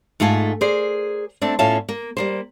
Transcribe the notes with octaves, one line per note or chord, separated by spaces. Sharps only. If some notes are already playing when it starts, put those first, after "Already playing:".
G#2 A3 F4 A4 G#5
G#4 A#4 C5 D5
A3 C4 D4
A2 C#4 F4 E5 A5
A#3
G3 A#3 C5